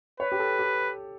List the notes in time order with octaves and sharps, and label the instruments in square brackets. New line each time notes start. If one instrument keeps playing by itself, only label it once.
[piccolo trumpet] B4 [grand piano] C#5
[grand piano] G4
A4
G4